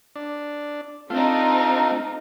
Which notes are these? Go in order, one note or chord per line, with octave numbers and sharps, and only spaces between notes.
D4
A3 C4 D4 D#4 F4